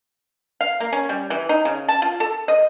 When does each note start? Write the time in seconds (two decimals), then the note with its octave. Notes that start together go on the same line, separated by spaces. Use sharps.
0.61 F5
0.80 A#3
0.92 C#4
1.09 G3
1.30 E3
1.49 D#4
1.65 C#3
1.88 A5
2.02 F4
2.20 A4
2.48 D#5